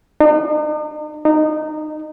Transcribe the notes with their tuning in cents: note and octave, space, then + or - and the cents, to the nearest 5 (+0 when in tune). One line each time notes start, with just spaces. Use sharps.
D#4 -45
D#4 -20